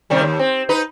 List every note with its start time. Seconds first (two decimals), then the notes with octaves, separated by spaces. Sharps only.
0.10 C3 D#3 G3
0.22 D#2
0.39 C4
0.69 D#4 B4